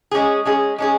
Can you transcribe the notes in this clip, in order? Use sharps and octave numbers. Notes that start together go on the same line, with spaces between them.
G#3 C#4 G#4
G#3 C#4 G#4
G#3 C#4 G#4